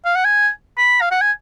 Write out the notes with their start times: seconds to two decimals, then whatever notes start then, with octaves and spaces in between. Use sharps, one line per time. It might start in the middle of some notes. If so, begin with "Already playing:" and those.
0.05 F5
0.15 F#5
0.24 G#5
0.78 B5
1.01 F5
1.11 F#5
1.21 G#5